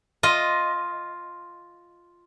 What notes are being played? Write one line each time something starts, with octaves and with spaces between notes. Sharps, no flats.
F4 D#5